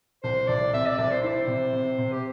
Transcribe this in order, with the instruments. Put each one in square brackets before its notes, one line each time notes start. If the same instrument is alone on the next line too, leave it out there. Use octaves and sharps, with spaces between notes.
[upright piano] C2 [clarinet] C5
[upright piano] C2 [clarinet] D5
[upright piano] C3 [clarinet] E5
[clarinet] D5
[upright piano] C2 [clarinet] D5
[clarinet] C5
[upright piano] E4 [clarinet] C5
[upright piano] C3
C3
C3
[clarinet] G4